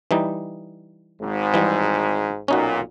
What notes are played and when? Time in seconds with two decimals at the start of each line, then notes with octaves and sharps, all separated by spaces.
0.11 E3 G3 D#4
1.22 G#1 G#2
1.54 E3 G3
2.48 B1 A#2 C#4 D#4 F#4